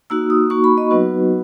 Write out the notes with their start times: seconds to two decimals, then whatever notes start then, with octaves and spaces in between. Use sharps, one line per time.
0.10 A#3 D#4 F#4 E6
0.30 D#6
0.50 A#3 D#4 F#4 C#6
0.64 B5
0.78 D#5
0.91 F#3 B3 D#4 F#4 B4